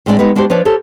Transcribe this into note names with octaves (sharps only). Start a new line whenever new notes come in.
A2 G#3 C4 D4 G4 D5
G#3 B3 D#4 G4 B4
G#3 D4 F#4 G4 C5
F3 D4 B4 C#5 D5
G4 A4 A#4 C5 C#5